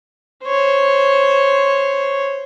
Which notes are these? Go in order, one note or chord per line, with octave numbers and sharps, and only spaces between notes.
C5 C#5